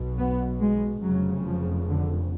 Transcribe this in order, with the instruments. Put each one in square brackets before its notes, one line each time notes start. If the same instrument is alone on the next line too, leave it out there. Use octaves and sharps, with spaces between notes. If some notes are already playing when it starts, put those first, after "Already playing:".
Already playing: [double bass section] B1 B2
B3
G#3
F1 F2 C#3 F#3
F3
D3